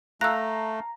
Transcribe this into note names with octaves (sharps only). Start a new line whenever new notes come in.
A3 F5 A5 A#5 E6 F#6